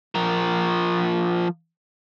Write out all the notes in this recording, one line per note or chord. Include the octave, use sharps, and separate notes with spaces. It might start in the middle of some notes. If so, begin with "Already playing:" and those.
F3 A#4